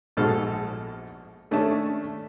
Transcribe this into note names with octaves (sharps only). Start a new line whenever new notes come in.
A#1 G#2 B2 A4 C5 F6
D#3 A3 C#4 D4 E5 A5